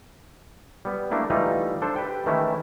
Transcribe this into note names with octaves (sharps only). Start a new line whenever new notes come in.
G3 B3
A3 A#3 D4 E4
E3 G3 A3 D#4 F4
D4 A4 C5
G4 B4 G5
D#3 E3 A3 C#4 E4